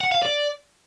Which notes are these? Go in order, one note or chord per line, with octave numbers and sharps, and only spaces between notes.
F#5
F5
D5